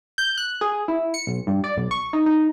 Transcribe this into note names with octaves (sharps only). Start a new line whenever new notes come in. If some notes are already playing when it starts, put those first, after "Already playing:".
G6
F#6
G#4
E4
C#7
B1
G2
D5
B1
C#6
D#4
D#4